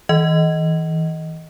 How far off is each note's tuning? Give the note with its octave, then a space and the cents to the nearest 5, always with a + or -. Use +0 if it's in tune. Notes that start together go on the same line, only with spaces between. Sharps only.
E3 -35 D#5 +0